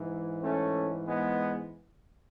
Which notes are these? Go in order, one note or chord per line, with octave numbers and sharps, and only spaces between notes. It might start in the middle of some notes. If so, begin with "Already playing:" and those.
Already playing: G#2 E3
A3 C#4
G#3 B3